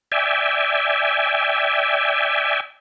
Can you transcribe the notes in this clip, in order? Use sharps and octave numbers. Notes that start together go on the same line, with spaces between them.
D5 E5 G5 G#5